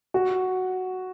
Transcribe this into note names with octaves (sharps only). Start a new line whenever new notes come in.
F#4